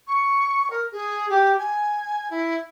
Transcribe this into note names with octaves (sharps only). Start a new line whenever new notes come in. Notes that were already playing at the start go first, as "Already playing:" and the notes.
C#6
A#4
G#4
G4
G#5
E4